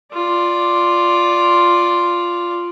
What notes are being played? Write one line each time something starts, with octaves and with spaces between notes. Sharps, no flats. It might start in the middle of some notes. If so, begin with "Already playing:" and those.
F4 D5